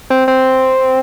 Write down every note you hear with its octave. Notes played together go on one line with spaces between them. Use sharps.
C4
C4